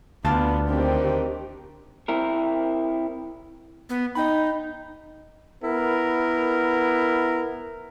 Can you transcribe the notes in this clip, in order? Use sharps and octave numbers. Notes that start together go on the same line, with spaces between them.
D2 B3 F4 D5 A5
D#3 C4 D4 G4
C4 E4 A#4
B3
D#4 D#5 G5 B5
B3 E4 A#4